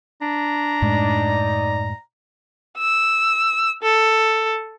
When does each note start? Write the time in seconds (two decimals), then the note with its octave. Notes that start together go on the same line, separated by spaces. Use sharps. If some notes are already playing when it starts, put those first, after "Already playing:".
0.22 D4 A#5
0.82 F#2 A2 G#3 D#4 D5
2.78 E6
3.83 A4